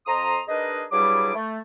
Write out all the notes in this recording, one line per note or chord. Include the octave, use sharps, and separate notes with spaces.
F2 A#5 C6 D#6
D4 D#4 G#4 A#4 B4 D#5
G2 F#3 G3 E4 G#4 D6
A3